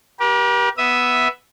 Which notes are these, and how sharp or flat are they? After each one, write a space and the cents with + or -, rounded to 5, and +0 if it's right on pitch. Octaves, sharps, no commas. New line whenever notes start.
G4 -10 A#4 +45
B3 +0 E5 +0 D#6 +0